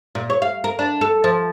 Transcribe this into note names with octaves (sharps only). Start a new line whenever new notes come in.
A#2
C#5
F5
A#4
D4
A4
F3